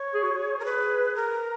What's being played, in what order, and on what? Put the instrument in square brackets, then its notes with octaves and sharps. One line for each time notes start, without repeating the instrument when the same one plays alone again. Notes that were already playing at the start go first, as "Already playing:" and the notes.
Already playing: [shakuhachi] C#5
[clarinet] G#4
F#4
G#4
[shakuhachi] A#4
B4
A#4